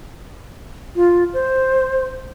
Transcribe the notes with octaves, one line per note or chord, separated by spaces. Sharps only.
F4
C5